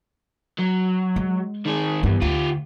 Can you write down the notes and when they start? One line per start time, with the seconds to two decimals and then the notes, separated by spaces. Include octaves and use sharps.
0.58 F#3
1.16 G#3
1.66 D#3 G#4
2.03 E2 G2 D#3 E3
2.22 D2 F4 G4